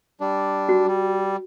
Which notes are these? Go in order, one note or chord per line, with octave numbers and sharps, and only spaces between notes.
G3 D4
F#4
G3